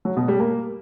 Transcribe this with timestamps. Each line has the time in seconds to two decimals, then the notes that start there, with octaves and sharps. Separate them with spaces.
0.05 F#3
0.17 B2
0.28 G3
0.40 A#3